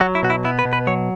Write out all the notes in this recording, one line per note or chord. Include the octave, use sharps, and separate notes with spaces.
F#3 F#4
E4
B2 F#4
E4
B3 E4
B4
B2
B4
F#3 C#5